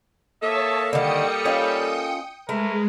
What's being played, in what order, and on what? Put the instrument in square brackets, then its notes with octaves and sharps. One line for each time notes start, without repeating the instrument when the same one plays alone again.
[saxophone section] A#3 A4 [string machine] C#5 A5 [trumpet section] E5 D#6
[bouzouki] D3 D#3 [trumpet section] G3 [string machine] G5 D#6 C#7
[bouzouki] C#4 F4 D#5
[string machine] G#3 [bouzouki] A3 [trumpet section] A#4 B4